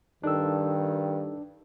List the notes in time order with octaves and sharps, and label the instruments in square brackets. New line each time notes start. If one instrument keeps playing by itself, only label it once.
[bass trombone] G2 [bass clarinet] D#3 [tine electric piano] D4 [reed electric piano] D#4 A4 E6